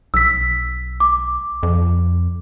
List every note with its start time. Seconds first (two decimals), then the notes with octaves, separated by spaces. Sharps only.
0.14 B1 E6 B6
1.00 D6
1.63 F2